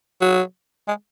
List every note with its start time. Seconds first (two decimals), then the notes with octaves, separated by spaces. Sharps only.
0.21 F#3
0.88 G#3